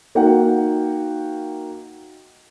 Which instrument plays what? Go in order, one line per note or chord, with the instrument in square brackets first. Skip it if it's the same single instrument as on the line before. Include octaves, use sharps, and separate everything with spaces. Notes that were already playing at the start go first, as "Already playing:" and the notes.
[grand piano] A#3 D#4 F#4 F#5 G5